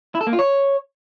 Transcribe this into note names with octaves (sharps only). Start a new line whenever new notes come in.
E4
A4
A#3
F4
C#5